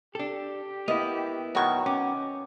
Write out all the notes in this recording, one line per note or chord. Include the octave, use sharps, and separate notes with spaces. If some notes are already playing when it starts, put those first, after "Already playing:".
D4 G4 A4
A#3 B3 E4 D#5
B2 D#3 F#3 F#4 C#6
C#4 G5 D6